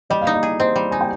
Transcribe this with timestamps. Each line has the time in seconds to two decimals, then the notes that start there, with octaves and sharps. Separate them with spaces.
0.10 G3 D#5
0.21 F5
0.27 D#4
0.34 D#5
0.43 G#4
0.59 C4 D#5
0.76 G3
0.91 D#4 G#5
1.01 G5